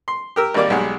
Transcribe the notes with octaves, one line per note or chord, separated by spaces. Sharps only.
C6
G4 A#4 E6
G#1 G3 A#3 D5 D6
B1 G3 G#3 F#5